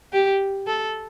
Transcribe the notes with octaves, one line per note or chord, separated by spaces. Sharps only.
G4
A4